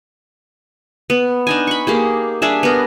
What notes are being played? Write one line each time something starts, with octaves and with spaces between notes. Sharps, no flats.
B3
D4 D#4 G#5
B5 C#6
A#3 G4 G#4
G3 D4 G#4 E5
B3 A#4